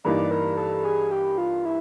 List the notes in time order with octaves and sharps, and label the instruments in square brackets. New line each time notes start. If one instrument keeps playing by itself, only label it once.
[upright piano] G2 E3 G3 A#3 D#4 [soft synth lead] D5
[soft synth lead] A#4
A4
G#4
G4
F4
E4